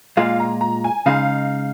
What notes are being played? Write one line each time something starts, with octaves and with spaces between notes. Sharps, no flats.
A#2 G#3 F4 F5
A#5
A#5
G#5
C#3 G#3 D#4 F5